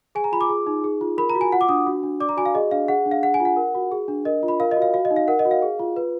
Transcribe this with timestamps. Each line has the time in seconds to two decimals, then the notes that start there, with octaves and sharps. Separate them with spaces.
0.15 G#4 G#5
0.24 A#5
0.32 F4 B5
0.41 D6
0.49 G#4
0.66 D#4
0.84 G#4
1.01 F4
1.18 A#4 B5
1.30 A#5
1.35 F#4
1.41 G#5
1.52 F4 F#5
1.61 D6
1.69 D4 D#6
1.86 F#4
2.03 D4
2.20 D5 D6
2.29 A#5
2.37 F#4 G#5
2.46 F5
2.55 G#4 D#5
2.71 D4 F5
2.88 G#4 F#5
3.06 D4
3.11 F5
3.23 G#4 F#5
3.34 G#5
3.40 F4
3.45 F#5
3.56 A#4
3.75 F#4
3.92 G#4
4.08 D4
4.25 A#4 D#5
4.43 F4
4.48 B5
4.60 A#4 F5
4.71 D#5
4.77 F#4
4.82 F5
4.94 F#4 F5
5.05 D#5
5.11 D#4
5.16 F5
5.28 A#4 F#5
5.39 D#5
5.45 F#4
5.51 F5
5.62 G#4
5.79 F4
5.96 B4